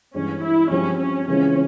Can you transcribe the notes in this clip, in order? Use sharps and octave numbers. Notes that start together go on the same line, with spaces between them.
G2 E3 G#3 C#4
E4
G2 F3 G#3 C4 C#4 G4
C#4
C#3 E3 G#3 C4 C#4 F4